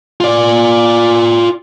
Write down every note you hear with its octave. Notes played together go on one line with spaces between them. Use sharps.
F4 D5